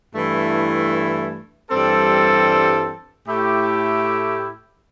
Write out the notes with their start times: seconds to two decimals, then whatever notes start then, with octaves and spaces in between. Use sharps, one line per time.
0.14 G2 E3 A3 E4
1.70 G2 E3 G3 C4 A4
3.26 A2 A3 E4 G4